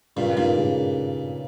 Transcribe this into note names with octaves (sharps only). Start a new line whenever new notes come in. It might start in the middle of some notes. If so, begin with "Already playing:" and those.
G2 A#2 C#3
G2 A#2 G#3 D#4 A#4
C#3